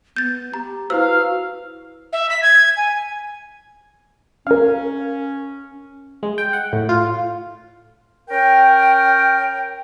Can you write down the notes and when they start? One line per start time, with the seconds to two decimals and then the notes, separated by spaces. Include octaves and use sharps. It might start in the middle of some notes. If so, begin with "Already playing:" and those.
0.16 B3 G6 A6
0.54 G4 A#5
0.90 E4 F#4 B4 C5 F5 E6
2.13 E5
2.30 B6
2.42 G#6
2.77 G#5
4.47 C#4 A#4 F5
6.23 G#3
6.38 G5
6.53 F#5
6.73 A2
6.89 F4
8.29 C#4 A#4 G5